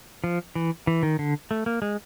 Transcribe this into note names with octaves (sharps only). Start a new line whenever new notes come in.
F3
E3
E3
D#3
D3
A3
A#3
G#3